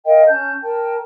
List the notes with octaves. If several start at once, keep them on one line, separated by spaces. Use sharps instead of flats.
A#4 D#5 F5 G5
C#4 A5 G6
A#4 G5 A5